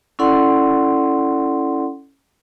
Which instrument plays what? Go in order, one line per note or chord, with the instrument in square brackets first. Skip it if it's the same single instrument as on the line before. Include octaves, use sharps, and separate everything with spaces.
[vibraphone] C#4 E4 A4 D5 F#5 C6